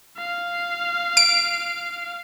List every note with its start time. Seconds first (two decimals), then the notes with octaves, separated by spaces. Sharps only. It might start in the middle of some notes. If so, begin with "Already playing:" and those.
0.18 F5
1.17 D7